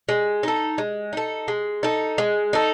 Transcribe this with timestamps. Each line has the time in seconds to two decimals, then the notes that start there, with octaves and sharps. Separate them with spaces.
0.09 G#3
0.43 D#4 A4
0.78 G#3
1.13 D#4 A4
1.48 G#3
1.83 D#4 A4
2.18 G#3
2.53 D#4 A4